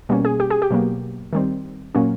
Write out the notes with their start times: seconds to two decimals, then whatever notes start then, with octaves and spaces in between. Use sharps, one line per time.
0.09 B2 G3 A#3 C#4
0.25 G#4
0.40 G4
0.50 G#4
0.62 G4
0.71 B2 F#3 A#3
1.33 D#3 G3 C4
1.95 A#2 F#3 A#3 C#4